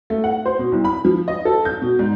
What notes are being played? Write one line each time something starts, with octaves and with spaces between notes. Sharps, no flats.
A3
F#5
C5
B2
C2
B5
F3
D#5
A4
G6
B2
G#2